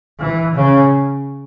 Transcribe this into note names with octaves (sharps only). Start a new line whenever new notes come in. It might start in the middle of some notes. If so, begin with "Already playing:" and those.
E3
C#3